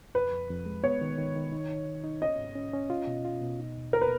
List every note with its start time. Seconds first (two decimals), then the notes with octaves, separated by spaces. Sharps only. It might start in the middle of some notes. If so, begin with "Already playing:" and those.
0.14 F2 B4
0.32 F2
0.49 F2
0.66 G#3
0.84 B3 C#5
1.01 D#3
1.18 D#3
1.36 D#3
1.52 D#4
1.69 D#4
1.87 D#3
2.04 D#4
2.22 C#4 D#5
2.39 G#2
2.55 C#4
2.73 C#4
2.90 F4
3.07 B2
3.25 F4
3.42 B2
3.59 D#4
3.76 D#2
3.93 D#2 A#4
4.01 B4